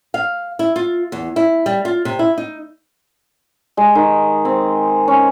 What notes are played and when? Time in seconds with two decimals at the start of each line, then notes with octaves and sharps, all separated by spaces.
0.14 F5
0.59 E4
0.76 F4
1.12 E2
1.36 E4
1.66 G3
1.85 F4
2.05 C3
2.19 E4
2.38 D#4
3.77 G#3
3.95 D#3
4.45 C4
5.08 C#4